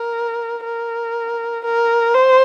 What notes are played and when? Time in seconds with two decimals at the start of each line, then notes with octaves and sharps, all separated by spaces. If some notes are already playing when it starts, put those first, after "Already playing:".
Already playing: A#4
0.64 A#4
1.65 A#4
2.14 C5